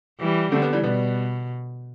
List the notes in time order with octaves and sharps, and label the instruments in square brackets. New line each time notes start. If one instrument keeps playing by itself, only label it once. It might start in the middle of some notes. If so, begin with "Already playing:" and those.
[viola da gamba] E3 G3
[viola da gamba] D3 [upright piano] A3 C4
[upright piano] G3 B3
E3 G3
[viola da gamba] B2 [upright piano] G3 B3